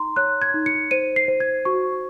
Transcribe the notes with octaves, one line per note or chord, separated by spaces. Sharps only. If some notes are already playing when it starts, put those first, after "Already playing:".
Already playing: D#4 A#5 C6
C#5 F#6
G#6
D#4
C#7
C5 D#7
C7
C5
G#6
F#4 C#6